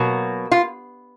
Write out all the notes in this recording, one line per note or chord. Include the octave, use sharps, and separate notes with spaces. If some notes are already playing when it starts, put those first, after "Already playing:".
Already playing: B2 F#3 A#3
F4